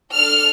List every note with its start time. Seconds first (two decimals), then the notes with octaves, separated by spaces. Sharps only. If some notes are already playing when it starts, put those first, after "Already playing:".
0.12 D4 A4 F6